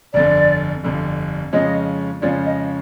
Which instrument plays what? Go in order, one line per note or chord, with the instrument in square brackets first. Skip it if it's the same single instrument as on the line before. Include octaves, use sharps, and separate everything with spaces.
[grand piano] G1 F2 D3 [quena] D5
[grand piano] G1 F2 D3
[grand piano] F2 C#3 F3 G#3 C#4 [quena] D#5
[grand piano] F2 C#3 F3 G#3 C#4 [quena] D5
[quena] D#5